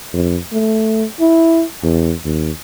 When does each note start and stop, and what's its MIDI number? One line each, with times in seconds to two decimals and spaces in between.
0.14 0.38 41
0.53 1.05 57
1.20 1.64 64
1.83 2.14 40
2.25 2.51 39